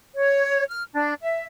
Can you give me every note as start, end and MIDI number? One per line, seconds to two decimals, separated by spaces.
0.15 0.64 73
0.71 0.84 89
0.93 1.13 62
1.23 1.45 76